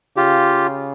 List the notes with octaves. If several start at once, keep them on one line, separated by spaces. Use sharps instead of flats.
C#3 F4 G4